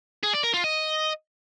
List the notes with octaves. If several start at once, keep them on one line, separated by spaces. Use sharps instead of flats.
G#4
D5
A#4
F4
D#5